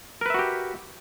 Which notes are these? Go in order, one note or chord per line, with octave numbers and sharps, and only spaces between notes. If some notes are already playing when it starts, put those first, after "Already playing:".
F#4 G4 A#4 B4 E5